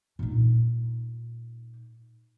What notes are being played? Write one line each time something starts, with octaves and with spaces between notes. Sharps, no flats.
A#2 D#4